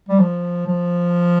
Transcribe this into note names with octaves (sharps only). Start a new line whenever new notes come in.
G3
F3
F3